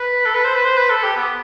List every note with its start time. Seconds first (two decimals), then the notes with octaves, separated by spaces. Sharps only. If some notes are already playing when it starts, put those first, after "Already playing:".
Already playing: B4
0.26 A4
0.35 B4
0.44 C5
0.55 B4
0.65 C5
0.77 B4
0.90 A4
1.04 G4
1.17 B3